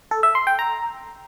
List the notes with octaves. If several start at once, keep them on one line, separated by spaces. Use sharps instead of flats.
A4
E5
C6
G5
A#5